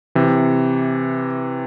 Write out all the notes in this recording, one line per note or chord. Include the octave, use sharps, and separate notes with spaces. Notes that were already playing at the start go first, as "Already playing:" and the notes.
C3 E3